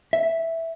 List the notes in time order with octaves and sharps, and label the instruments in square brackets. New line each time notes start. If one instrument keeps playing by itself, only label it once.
[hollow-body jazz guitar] E5